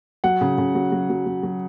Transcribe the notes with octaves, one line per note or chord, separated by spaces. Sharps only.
F#3 F#5
C#3
C#3
F#3
F#3
F#3
F#3
F#3